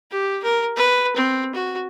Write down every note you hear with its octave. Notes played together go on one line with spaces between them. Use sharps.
G4
A#4
B4
C4
F#4